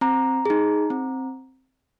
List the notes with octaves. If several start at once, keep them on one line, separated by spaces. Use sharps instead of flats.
C4 A#5
D#4 G#4
C4